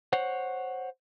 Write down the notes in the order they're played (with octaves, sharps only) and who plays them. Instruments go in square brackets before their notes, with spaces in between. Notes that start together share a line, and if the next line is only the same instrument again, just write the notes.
[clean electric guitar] C5 C#5 F#5